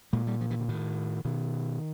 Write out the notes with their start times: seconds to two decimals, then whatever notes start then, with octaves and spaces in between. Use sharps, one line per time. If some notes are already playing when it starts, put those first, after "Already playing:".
0.13 A#2 G#3
0.27 G3
0.41 F3
0.50 E3
0.60 D3
0.68 A2 D#3
1.25 B2 D#3